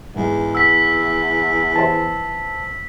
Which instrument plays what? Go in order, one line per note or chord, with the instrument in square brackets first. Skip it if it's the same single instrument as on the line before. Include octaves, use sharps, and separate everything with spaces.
[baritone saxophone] E2 [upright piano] G#2 G#3
[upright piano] F#5 [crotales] E6 B6
[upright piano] E3 C5 E5 [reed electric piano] A5